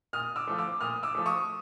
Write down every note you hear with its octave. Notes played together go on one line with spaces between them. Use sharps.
A#2 D#6 F6
D6 E6
F3 A3
D6 E6
A#2 D#6 F6
D6 E6
F3 A3
C#6 D#6